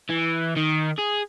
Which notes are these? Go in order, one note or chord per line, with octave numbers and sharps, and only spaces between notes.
E3
D#3
G#4